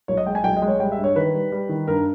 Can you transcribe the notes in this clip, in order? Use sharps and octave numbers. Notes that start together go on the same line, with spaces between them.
B1 C#5
D#5
G#3 G5
G#5
B1 G5
D#5
G#3
C#5
G3 G5
E5
G2
C#5
D#3 B4
G3
G3
D#3
G2 A#4